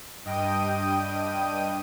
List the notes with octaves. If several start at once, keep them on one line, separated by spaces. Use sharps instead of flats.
G2 D#5 G5 D#7